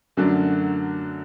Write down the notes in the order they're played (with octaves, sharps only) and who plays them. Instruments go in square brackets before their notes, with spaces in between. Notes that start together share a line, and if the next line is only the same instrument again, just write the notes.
[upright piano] F#2 D3 F#3 A3 D4